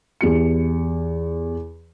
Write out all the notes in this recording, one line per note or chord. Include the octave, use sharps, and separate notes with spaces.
E2 G4 C#7